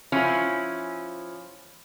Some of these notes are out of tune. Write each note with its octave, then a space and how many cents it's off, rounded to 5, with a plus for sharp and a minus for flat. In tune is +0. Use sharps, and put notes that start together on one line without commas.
F3 +0 C#4 +0 E4 +0